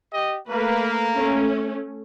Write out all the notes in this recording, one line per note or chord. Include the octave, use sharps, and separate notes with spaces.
G4 D#5
A3 A#3 B4
A3 C#4